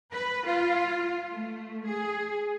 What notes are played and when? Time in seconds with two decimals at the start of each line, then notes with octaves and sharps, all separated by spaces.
0.12 B4
0.46 F4
1.31 A3
1.85 G#4